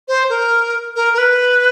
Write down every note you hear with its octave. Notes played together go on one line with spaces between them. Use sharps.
C5
A#4
A#4
A#4
B4